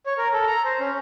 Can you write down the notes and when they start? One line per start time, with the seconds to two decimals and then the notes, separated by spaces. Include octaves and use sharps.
0.06 C#5
0.18 A#4
0.33 A4
0.47 A#5
0.65 C5
0.80 C#4